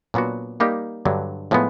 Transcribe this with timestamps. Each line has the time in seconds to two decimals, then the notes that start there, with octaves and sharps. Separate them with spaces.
0.14 A#2 F#3 B3 D4 F#4
0.60 G3 A#3 D#4 G4
1.05 G2 D3 F#3
1.51 A2 F3 G#3 B3